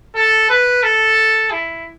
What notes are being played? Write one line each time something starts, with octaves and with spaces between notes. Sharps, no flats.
A4
B4
A4
E4